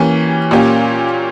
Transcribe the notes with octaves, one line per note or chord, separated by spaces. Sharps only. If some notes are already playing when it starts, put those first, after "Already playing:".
Already playing: E3 A#3 C#4 G4
A#2 A#3 C#4 G4